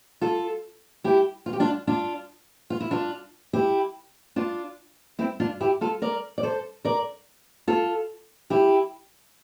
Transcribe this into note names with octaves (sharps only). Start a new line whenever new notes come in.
F4 A4
E4 G4
F4
G4
D4 F4
D4 F4
F4
E4
D4 F4
E4 G4
D4 F4
C4 E4
D4 F4
E4 G4
F4 A4
A#4 D5
D5
A4 C5
A#4 D5
F4 A4
E4 G4